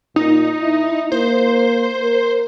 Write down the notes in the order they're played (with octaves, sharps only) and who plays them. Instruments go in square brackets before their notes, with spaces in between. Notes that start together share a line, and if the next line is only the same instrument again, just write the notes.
[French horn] A#2 [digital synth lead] D#4
[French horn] E4
[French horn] A#3 [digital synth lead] C5
[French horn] A#4